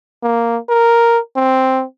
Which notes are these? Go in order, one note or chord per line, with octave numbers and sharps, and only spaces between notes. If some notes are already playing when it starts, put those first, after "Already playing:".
A#3
A#4
C4